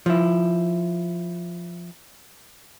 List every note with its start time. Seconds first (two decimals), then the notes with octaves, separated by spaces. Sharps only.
0.06 F3 E4